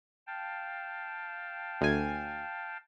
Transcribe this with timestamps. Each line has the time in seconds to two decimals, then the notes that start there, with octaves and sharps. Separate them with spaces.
0.27 F5 G5 A5
1.81 D2 G#5